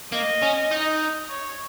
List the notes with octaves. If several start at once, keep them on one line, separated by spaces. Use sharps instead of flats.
A#3 D#5
C#4
D#4
C#5